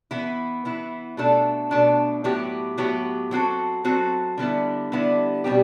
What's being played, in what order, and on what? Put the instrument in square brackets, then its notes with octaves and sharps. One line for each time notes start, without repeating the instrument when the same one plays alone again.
[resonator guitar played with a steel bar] E3 B3 E4
E3 B3 E4
B2 A3 D4 A4
B2 A3 D4 A4
A2 F#3 B3 E4 G4
A2 F#3 B3 E4 G4
F#3 C4 F#4 A4
F#3 C4 F#4 A4
D3 G3 B3 E4
D3 G3 B3 E4
B2 G3 C4 G4